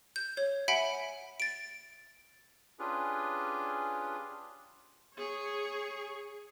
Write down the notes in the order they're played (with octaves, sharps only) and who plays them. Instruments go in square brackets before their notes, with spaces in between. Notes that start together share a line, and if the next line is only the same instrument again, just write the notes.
[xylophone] G6
C#5
E5 F#5 G#5 B5 D7
A6 D7
[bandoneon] C#4 D4 F4 G4 G#4 B4
[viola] G#4 C#5